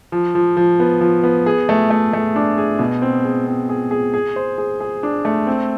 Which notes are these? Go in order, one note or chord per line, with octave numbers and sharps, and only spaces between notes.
F3
F3
F3
B3
F3
B3
G#4
A3
A3
A3
D4
G#4
B2
C4
G#4
C4
G#4
G#4
G#4
C5
G#4
G#4
D4
A3
C4